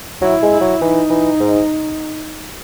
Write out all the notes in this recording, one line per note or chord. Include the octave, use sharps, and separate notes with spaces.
F#3 E4
G#3
E4
F#3
E3 D#4
E3
G#2